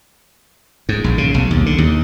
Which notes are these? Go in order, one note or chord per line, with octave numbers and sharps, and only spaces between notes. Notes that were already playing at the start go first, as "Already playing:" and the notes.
G#2
A#1
C#3
B1
D#2
D3
D#2